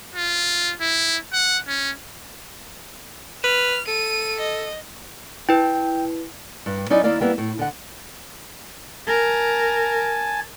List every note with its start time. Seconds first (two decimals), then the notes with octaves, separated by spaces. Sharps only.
0.15 F4
0.80 E4
1.33 F#5
1.67 C#4
3.44 B4 F6
3.88 A4 D#7
4.40 D#5
5.49 E4 B4 G5
6.66 G2
6.90 F#3 C#4 D#4 E4 D5
7.04 D#2 A#3 E4 D5 F5
7.20 G3 A#3 B3 E4
7.38 A2
7.59 D3 F#5
9.07 A#4 G#5 A5